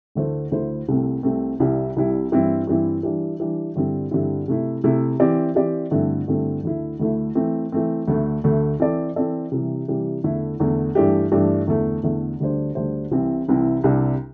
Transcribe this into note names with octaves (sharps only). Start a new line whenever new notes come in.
D2 D3 A3 E4 C5
D2 D3 A3 E4 C5
C2 C3 A3 C4
C2 C3 A3 C4
C2 C3 G3 E4
C2 C3 G3 E4
G2 E3 C4 E4
G2 E3 C4 E4
E3 G3 D4
E3 G3 D4
G2 D3 G3 C4 E4
G2 D3 G3 C4 E4
C3 A3 E4
C3 A3 E4
E3 C4 G4 D5
E3 C4 G4 D5
G2 D3 A3 C4 E4
G2 D3 A3 C4 E4
D2 D3 A3 E4
D2 D3 A3 E4
E3 A3 C4
E3 A3 C4
D2 D3 A3
D2 D3 A3
E3 C4 A4 D5
E3 C4 A4 D5
C3 E3 G3
C3 E3 G3
E2 D3 A3 E4
E2 D3 A3 E4
G2 E3 A3 D4 G4
G2 E3 A3 D4 G4
E2 D3 A3
E2 D3 A3
D2 D3 G3 D4 C5
D2 D3 G3 D4 C5
C2 C3 E3 C4 E4
C2 C3 E3 C4 E4
C2 C3 G3 D4